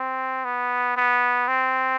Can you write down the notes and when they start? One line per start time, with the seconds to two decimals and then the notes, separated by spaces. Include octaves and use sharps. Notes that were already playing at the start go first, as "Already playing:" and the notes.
Already playing: C4
0.45 B3
0.97 B3
1.48 C4